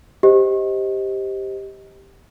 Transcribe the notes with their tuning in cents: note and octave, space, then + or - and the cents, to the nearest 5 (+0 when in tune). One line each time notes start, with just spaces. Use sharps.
G4 +0 C5 -5 D#5 +15